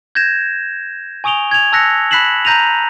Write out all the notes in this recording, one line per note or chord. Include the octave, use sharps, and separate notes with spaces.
G6 G#6 A#6 E7
G#5 C#6 D#6 D7 F7 G7
G#6 F7
A5 E6 F#6 A#6 B6 C#7
B5 F#6 B6 C7 E7 F#7
A#5 G6 A#6 D#7 F7